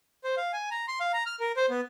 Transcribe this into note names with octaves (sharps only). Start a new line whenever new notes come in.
C5
F5
G#5
A#5
C6
F5
A#5
F6
A#4
C5
B3